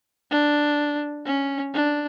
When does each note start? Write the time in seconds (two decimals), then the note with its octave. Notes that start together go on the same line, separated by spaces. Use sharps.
0.31 D4
1.26 C#4
1.73 D4